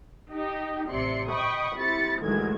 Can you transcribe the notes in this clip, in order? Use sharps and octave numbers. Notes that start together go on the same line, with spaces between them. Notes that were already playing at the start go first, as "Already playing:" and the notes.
D#4 G4
A1 C3 D5 C6 C#7
D#5 G5 B5 C#6 D#6
C4 E4 G4 B5 A6 C#7
A1 D2 D#3 F#3 G#3 G#6